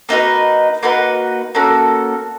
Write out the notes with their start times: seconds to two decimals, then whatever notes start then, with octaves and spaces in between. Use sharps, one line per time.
0.09 A#3 D#4 F#4 B4
0.83 A#3 D#4 F#4 B4
1.55 A#3 C#4 F#4 A4